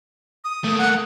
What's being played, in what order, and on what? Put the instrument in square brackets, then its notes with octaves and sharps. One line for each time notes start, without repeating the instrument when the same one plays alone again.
[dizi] D#6
[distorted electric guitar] A3 A#3
[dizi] F#5